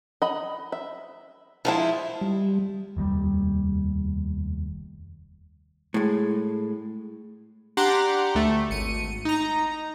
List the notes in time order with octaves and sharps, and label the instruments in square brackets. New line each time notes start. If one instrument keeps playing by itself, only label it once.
[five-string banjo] D#5 B5
E5
[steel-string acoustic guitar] F3 G#3 E4 [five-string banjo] F4 F5 A5
[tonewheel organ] G3
[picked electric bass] F1 D#2 B2 G3
[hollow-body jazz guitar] A2 G#3
[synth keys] D4 G4 F#5 A#5 C6 D6
D2 A3
G#1 C#7 D#7
D#4 A#5